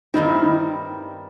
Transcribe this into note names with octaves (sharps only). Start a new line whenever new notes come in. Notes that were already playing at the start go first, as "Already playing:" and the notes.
G2 D#3 G3 C4 D#4
E4
D#4